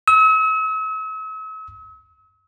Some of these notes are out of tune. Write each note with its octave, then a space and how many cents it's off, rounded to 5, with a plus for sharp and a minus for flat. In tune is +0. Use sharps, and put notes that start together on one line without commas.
E6 -45